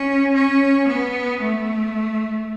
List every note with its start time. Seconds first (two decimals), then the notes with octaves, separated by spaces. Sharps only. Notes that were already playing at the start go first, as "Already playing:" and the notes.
Already playing: C#4
0.33 C#4
0.87 B3
1.40 A3